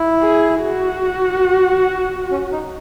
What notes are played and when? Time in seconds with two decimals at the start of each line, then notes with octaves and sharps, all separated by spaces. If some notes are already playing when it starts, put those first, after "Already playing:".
Already playing: E4
0.22 G#4
0.63 F#4
2.31 C#4
2.52 D#4